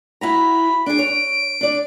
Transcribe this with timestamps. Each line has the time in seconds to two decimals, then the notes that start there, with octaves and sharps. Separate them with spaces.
0.21 E4 F#4 A#5 B5
0.86 D4 G#4 D7
0.99 C#5
1.61 D4 D5